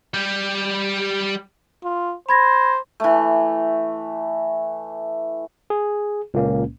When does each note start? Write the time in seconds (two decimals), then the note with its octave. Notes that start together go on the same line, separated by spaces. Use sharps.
0.14 G3 G4
1.84 F4
2.29 C5 B5 G#6 A#6
3.00 E3 A3
5.70 G#4
6.34 C#2 A#2 A#3 C#4